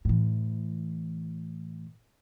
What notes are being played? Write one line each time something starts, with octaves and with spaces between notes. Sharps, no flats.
A2 E3